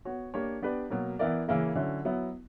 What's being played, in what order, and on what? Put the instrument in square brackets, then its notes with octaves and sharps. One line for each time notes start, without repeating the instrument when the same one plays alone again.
[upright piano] B3 F#4 C#5
A#3 D4 G4 C#5
B3 D4 G4 B4 D5
B2 F#3 A#3
E3 B3 E4 A#4 D5
C#3 E3 A#3 E4 A#4
D3 F#3 C#4 E4
F#3 B3 E4